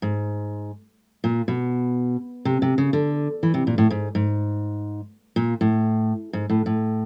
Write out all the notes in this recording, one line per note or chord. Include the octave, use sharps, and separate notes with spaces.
G#2
A#2
B2
C3
C3
C#3
D3
E3
C3
A#2
A2
G#2
G#2
A#2
A2
G#2
A2
A2